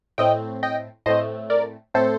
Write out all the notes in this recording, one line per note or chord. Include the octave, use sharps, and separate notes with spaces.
A2 A3 C4 D#5 G5
D#5 G5
A2 A3 C4 C5 D#5
A#4 D5
A2 A3 C4 A4 C5